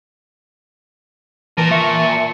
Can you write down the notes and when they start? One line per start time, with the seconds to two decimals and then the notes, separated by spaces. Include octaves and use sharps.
1.58 A#2 E3 A#4 A5
1.71 E5 C#6